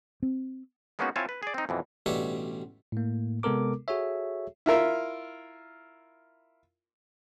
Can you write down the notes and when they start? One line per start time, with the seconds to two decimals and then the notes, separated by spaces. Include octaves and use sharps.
0.23 C4
0.99 G#3 A#3 B3 C#4 D#4 F#4
1.16 C4 E4 F4 C#5 G#5 A5
1.29 B4
1.43 G#4 D5
1.54 C4 D#4
1.69 F2 B2 E3
2.06 A1 B2 G3 D4 C#5 E5
2.92 A2 A#3
3.43 C3 G#3 B3 A4 A#4 D6
3.88 F#4 G#4 A4 C#5 E5
4.66 E4 F4 A#4 E5